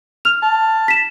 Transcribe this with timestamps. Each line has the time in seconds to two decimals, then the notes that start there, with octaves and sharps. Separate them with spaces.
0.25 F6 F7
0.43 A5
0.88 B6 E7